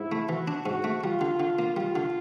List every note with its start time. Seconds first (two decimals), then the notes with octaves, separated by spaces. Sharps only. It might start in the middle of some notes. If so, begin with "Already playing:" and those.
Already playing: G#2 E4
0.12 A3
0.29 E3 F#4
0.48 D4
0.66 G#2 F#4
0.84 A3
1.03 G3 F4
1.21 D3
1.40 D3
1.59 A#3
1.77 G3 F4
1.96 D3